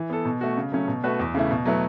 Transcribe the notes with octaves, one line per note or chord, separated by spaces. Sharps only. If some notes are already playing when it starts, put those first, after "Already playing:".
Already playing: E3
B3 A4
B2
A3 F#4
C#3
F#3 A3 C#4
B2
A3 F#4 B4 E5
E2
C#3 A3 E4
B2
F#3 A3 E4 B4